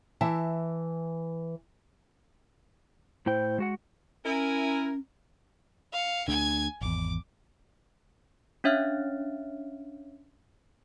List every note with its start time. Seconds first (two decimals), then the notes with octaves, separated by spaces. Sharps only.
0.21 E3 E5 A5
3.26 A2 E4 C5 G5
3.58 G#3 F#4 F#5
4.25 C#4 E4 A#4 G#5
5.92 F5 C#7
6.28 D2 D3 G#5 G#6
6.81 G#1 E2 D6
8.64 C#4 D4 C#5 E5 F5 F6